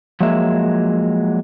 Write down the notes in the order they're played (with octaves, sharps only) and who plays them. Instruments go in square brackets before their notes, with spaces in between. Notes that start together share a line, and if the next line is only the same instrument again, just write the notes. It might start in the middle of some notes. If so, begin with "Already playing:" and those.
[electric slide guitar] F3 F#3 G#3 A#3 E5